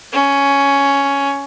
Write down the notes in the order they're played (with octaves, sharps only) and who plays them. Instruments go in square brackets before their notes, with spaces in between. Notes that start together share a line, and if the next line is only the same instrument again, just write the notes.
[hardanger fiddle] C#4